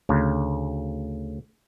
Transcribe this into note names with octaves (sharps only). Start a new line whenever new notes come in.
D2 C#3